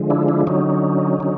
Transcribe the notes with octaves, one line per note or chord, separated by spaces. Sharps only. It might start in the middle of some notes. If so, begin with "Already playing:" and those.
Already playing: D3 F3 G#3
D4 E4
D4 E4
D3 F#3 C#4 D#4
D3 F#3